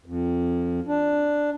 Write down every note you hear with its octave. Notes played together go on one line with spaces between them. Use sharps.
F2
D4